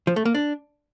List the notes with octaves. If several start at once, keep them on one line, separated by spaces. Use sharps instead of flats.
F3
A3
A#3
D4